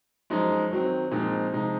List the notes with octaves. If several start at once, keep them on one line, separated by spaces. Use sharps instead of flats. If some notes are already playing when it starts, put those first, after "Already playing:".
F#2 F3 G#3 D#4
D#3 F#3 C4
A#2 F3 G#3 C4 D#4
C3 F3 G#3 C4 D#4